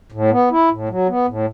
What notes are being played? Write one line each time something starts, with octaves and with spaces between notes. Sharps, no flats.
A2
B3
E4
A2
F#3
B3
A2